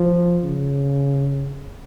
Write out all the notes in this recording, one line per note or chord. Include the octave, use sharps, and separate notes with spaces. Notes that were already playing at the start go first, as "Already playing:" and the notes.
Already playing: F3
C#3